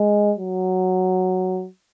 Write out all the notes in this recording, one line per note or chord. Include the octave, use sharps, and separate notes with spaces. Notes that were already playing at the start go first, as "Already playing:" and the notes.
Already playing: G#3
F#3